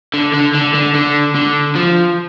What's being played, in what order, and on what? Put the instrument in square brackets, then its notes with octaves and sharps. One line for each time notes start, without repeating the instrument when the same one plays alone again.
[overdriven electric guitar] D3
D3
D3
D3
D3
D3
F3